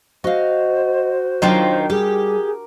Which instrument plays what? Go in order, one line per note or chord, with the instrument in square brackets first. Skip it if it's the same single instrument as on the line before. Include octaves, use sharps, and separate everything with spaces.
[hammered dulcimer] F#4 [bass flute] C5 [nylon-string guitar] D#5 F5
[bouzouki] D#3 F4 G5 [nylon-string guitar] F#3 D4 [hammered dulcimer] A#4
[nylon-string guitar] G3 [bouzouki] G4 [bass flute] G#4